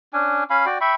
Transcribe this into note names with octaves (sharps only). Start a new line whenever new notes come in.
C#4 D4 G#5
C#4 F5 G#5 B5
F#4 D5 G5
E5 G5 B5 C#6